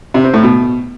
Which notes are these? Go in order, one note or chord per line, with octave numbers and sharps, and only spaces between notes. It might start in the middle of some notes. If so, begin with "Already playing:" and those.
C3
C4
A2
B2